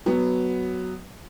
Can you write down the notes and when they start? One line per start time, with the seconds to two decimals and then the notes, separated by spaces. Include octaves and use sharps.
0.06 F#3 B3